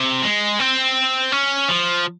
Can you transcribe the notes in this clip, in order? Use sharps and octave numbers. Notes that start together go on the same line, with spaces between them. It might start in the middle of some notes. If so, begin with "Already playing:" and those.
Already playing: C3
G#3
C4
C#4
F3